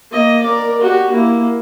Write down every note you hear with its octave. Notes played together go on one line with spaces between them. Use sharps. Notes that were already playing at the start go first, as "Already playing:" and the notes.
A#3 D#5
A#4 D5
F#4 G4
A#3 E4